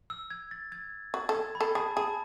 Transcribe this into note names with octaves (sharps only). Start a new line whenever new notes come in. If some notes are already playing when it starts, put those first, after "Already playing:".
E6
G#6
A6
G#6
F#4
A4
G#6
B5
A4
G#4 A5
G#4 A5